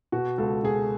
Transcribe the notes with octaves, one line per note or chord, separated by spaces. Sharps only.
B2 F#4
C#2 A4
B2 G#4